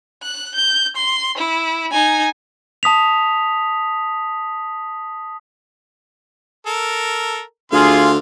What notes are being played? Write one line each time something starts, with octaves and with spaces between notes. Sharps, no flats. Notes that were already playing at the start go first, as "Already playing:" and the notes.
F#6
G6
C6
E4
D#4 G#5
A5 D#6 B6 F7
A4 A#4
D2 D3 F4 G#4 F5 C6